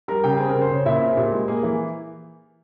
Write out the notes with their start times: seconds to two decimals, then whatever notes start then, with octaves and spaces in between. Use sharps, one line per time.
0.08 G3 A#4 A#5
0.23 C#3 G4 G5
0.37 C4 G#4
0.49 A#4
0.55 C#3
0.61 C5
0.70 C#3 C#5
0.86 A#2 E4 E5
0.95 C5
1.01 C4 A#4
1.09 G#4
1.17 A#2 G4
1.32 G#3
1.48 A#3 G#4
1.63 E3